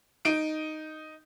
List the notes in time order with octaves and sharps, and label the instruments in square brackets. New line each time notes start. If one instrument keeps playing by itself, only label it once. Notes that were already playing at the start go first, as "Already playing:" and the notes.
[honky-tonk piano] D#4 D7